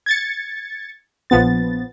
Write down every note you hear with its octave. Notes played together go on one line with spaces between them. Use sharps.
G#6 A6 C#7
A#1 F3 B3 A6